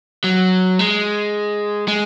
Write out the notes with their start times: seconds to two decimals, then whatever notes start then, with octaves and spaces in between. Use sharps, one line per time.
0.24 F#3
0.79 G#3
1.88 G#3